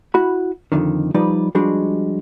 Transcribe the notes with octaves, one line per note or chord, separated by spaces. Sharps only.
E4 F#4 B5
F2 G#2 D3 D#3
F3 G3 D#4 B4 D5
F3 G3 G#3 D4 F#4